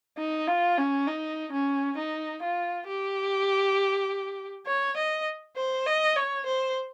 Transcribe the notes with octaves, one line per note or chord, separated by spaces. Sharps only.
D#4
F4
C#4
D#4
C#4
D#4
F4
G4
C#5
D#5
C5
D#5
C#5
C5